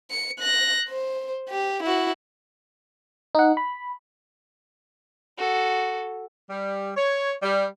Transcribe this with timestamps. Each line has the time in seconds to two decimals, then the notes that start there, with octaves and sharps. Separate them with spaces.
0.11 C#7
0.39 F#6 A#6
0.89 C5
1.49 G4
1.83 E4 F#4
3.35 D#4 F#5
3.57 B5
5.37 F#4 A4
6.49 G3
6.96 C#5
7.42 G3